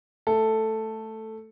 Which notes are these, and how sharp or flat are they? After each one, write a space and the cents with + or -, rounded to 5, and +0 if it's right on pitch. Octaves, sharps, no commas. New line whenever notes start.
A3 +0 A4 +5